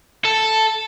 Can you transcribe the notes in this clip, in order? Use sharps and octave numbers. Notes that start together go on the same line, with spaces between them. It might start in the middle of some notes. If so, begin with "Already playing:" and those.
A4